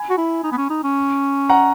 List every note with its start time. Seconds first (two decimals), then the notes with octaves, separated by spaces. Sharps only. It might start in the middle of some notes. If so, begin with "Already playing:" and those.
Already playing: G#5 B5
0.10 F#4
0.18 E4
0.44 D#4
0.52 B3
0.57 C#4
0.70 D#4
0.84 C#4
1.49 F#5 A#5